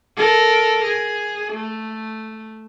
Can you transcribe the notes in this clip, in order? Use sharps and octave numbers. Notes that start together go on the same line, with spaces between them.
A4 A#4
G#4
A3